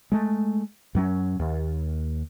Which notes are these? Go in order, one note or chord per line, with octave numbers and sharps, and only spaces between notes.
G#3 A3
F#2 F#3 C#4
D#2